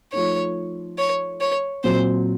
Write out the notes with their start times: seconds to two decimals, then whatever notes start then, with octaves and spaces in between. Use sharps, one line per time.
0.13 F3 A3 D#4 C#5
0.98 C#5
1.41 C#5
1.83 A#2 F#3 C4 C5